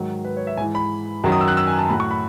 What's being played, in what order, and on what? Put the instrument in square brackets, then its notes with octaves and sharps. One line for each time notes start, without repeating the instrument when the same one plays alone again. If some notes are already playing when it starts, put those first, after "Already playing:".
Already playing: [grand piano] G#2 D#3 F#3
B4
C#5
E5
G#2 E3 G#5
B5
F#2 D#3 F#3
D#6
E6
F#6
E6
G#5
A5
A2 F#3 B5
C#6
B5